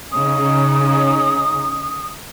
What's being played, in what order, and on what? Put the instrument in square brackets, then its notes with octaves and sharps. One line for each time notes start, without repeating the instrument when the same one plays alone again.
[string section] C#3 C#4 D#4 [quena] D#6